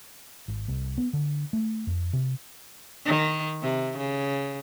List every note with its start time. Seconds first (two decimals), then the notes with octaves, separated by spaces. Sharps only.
0.48 G#1
0.68 C2
0.98 B3
1.13 D3
1.53 A3
1.87 F2
2.13 C3
3.05 D#3
3.62 C3
3.97 C#3